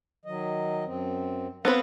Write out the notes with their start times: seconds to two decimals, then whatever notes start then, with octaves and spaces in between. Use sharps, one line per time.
0.25 D#3 F#3 D#5
0.85 F#2 C4
1.65 B3 C4 B4 C5 F5